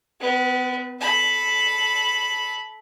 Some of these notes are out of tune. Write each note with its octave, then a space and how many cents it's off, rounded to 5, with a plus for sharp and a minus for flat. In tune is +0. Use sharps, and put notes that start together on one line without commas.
B3 +35 B4 -20
A4 -15 B5 +0